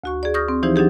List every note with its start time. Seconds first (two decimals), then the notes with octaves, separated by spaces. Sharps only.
0.04 D2 F#4 C#6
0.23 G#4 D5
0.34 C#6 D#6 F6 G6 A#6
0.48 C4
0.63 E3 F3 D#4 E4 G4 C5
0.76 F#3 D4 D#4 G4 G#4